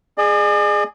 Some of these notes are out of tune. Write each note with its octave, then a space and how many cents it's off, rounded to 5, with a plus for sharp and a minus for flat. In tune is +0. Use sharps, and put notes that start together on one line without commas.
G#4 +0 D5 +45